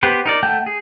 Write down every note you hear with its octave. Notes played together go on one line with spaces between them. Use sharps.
B3 G4 B4 C5
D#4 A#4 D5
A3 F#5 G5 A5 G6
G#4